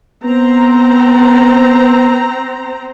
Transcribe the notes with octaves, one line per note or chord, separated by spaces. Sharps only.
B3 C4 C5 A#5